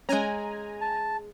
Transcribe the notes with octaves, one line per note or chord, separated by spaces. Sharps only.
G#3 C#4 G#5 A#5
A5